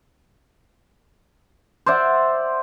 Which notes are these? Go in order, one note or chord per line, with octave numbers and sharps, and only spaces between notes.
C5 D5 E5 F#5